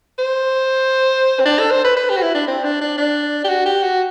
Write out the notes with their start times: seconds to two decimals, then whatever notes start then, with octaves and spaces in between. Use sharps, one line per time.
0.19 C5
1.40 C4
1.45 D4
1.59 A4
1.71 C5
1.84 B4
1.97 B4
2.10 G4
2.17 F#4
2.22 E4
2.35 D4
2.47 C4
2.64 D4
2.81 D4
2.97 D4
3.44 G4
3.49 F#4
3.66 G4
3.83 F#4